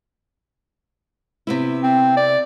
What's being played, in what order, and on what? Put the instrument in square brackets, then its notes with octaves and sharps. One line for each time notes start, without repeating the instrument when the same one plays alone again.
[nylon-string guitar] C3 B3 E4
[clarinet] C4
D5